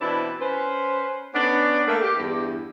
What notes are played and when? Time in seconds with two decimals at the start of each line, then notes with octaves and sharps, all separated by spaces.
0.01 B2 E3 C4 D4 E4 B4
0.40 C#4 B4 C5
1.34 B3 C#4 D4
1.87 A3 A#3
2.02 G4
2.17 E2 G2